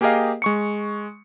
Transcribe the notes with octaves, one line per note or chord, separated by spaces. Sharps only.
A#3 G4 G#4 A#4 D#5 F5
G#3 C#6 C#7